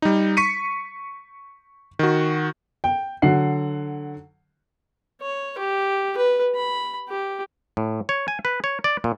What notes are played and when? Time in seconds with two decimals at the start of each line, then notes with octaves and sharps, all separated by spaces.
0.02 G3 D#4
0.37 C#6 B6 C#7 D#7
1.99 D#3 F#4
2.84 G5
3.22 D3 F#3 F#5 C7
5.21 C#5
5.58 G4
6.17 B4
6.55 B5
7.09 G4
7.77 A2
8.09 C#5
8.28 G#5
8.45 B4
8.64 C#5
8.84 D5
9.04 A#2